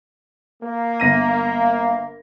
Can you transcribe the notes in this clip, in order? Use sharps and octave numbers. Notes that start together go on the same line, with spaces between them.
A#3
G1 A#6 D#7